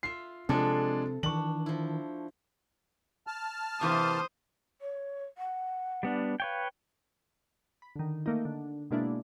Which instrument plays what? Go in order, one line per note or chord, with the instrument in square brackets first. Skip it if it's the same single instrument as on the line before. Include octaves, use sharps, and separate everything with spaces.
[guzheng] F4 E5 [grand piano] C7
[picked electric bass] C3 C4 [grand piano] F3 G#3 D4 [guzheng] A4 E5
[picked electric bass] D#3 E3 [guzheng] D4 [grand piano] C#6 F#7
[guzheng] F3 E4
[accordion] A5 F6
[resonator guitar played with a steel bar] C3 E3 A#3 [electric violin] C5 D#6
[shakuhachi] C#5
F#5
[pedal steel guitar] G3 B3 D4
[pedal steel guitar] B4 C#5 G5 [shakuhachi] F5
[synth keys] B5
D3 D#3
A3 A#3 D#4
D3
B2 G#3 A#3 D4 E4